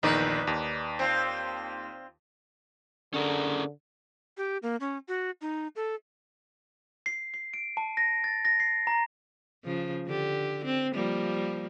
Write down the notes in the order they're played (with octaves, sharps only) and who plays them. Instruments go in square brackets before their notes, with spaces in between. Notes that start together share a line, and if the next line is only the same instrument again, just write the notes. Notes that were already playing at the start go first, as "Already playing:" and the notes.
[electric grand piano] A#1 E2 D#3 [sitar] D#4 B4 D5
[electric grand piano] D#2
[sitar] C4 F4
[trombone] D3 [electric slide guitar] C#4 G#4 A#4
[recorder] G4
A#3
C#4
F#4
D#4
A4
[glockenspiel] C7
C7
D7
A5
A#6
A6
A#6
C7
A#5
[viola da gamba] C#3 F3
D3 G4
C4
F3 G3 A#3